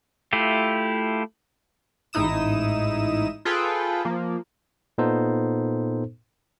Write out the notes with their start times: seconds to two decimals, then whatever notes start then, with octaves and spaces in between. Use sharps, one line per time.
0.33 A3 E4 F4 G4
2.13 A1 G#2 D#4 E4 D#6 E7
3.45 F4 G#4 A4 B4 G5
4.05 F3 A#3
4.98 A#2 B3 D#4 A4 C5